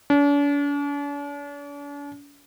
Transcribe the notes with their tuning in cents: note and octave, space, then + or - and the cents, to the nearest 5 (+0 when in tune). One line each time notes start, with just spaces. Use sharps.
D4 -45